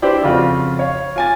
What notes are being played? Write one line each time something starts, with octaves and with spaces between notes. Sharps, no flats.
D4 E4 G4 B4 C5 D5
F2 C#3 F4 F#4
C#5 F5
F4 G#5 A6